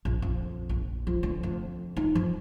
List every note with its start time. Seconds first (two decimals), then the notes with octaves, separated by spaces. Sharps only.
0.05 A#1
0.22 F2
0.69 A#1
1.07 F3
1.23 D2
1.43 F2
1.97 D#4
2.15 F3